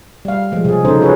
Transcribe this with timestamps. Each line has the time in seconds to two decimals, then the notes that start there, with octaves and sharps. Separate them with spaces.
0.25 G3 F5
0.52 F3 G#3
0.65 C3 G#4
0.85 C#3 F#3 C#4 D#4 A4 C5
1.00 F4 F#4 G#4 B4 C#5